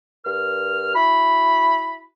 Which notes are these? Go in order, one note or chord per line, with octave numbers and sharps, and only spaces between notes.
G2 A#4 F6
E4 F#4 B5